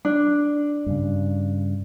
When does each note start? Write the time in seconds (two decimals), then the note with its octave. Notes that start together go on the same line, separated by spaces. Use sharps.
0.05 D4
0.86 G2 C#3